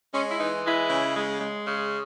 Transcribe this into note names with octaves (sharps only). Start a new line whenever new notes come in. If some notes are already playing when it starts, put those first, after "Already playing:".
G#3 C#4
E4
E3 D#4
G#3 E4
C#3
G#3
G#3
C#3